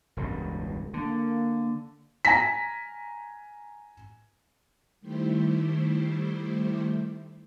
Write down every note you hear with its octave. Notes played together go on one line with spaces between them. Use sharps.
E1 C#2 G2
D3 A#3
G#5 A#5 A#6 B6
D#3 G3 A3 E4 G4 C5